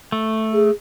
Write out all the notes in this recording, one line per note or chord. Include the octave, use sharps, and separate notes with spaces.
A3
G#4